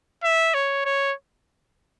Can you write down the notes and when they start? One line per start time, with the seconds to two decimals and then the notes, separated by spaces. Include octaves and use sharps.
0.23 E5
0.54 C#5
0.85 C#5